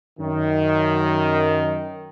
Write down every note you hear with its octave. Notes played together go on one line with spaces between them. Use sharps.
F#2 D#3